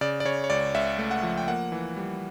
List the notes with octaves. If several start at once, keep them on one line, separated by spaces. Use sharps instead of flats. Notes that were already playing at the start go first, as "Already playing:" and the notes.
C#3 D5
D5
C#3 C#5
C#5
C#2 D5
C#2 E5
A3
F#5
F3
G5
A#3 F#5
E3
G3